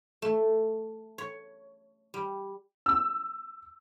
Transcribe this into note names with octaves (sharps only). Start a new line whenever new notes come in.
A3
C#5
G3
E6